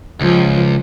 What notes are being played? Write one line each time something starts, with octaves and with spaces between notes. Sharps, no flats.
C#2 F3